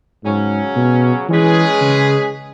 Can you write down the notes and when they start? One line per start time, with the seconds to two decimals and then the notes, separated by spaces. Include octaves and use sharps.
0.24 G#2 C#3 F#3 C#4
0.76 B2
1.29 E3 G#3 C#4 G#4 B4
1.81 C#3